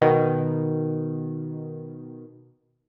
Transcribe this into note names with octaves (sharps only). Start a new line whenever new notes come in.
B2 D#3